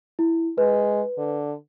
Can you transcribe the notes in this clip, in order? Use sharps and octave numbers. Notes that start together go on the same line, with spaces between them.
E4
G#3 B4
D3